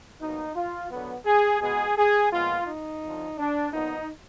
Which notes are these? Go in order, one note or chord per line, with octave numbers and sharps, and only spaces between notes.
B2 F#3 A#3 D#4
F4
D3 F#3 B3
G#4
B2 G#3 B3 G#4
G#4
A#2 F3 G#3 B3 F4
D#4
F2 D3 F3
D4
A#2 F3 B3 D#4